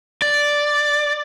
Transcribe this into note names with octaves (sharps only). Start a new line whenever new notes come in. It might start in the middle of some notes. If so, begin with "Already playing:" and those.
D5